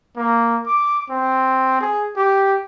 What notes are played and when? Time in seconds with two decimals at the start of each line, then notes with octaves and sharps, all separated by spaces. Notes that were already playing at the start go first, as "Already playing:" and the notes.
0.17 A#3
0.66 D6
1.10 C4
1.81 G#4
2.17 G4